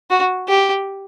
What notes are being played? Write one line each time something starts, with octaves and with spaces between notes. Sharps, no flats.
F#4
G4